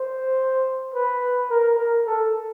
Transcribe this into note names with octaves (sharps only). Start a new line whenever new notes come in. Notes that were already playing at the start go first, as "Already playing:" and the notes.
Already playing: C5
B4
A#4
A#4
A4